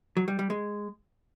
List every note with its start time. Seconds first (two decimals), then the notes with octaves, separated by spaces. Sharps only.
0.17 F#3
0.28 G3
0.39 G3
0.50 G#3